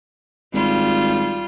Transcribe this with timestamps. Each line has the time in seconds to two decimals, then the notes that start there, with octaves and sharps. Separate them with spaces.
0.54 G#1 G3 F4